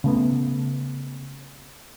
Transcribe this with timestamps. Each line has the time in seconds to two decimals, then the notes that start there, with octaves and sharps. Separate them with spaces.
0.04 C#3 A3 B3